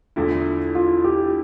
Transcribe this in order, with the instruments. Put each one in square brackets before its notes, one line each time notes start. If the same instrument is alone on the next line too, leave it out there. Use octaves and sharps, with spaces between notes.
[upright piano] E2 D3 A3 E4 [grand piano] F4
[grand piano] F4
G4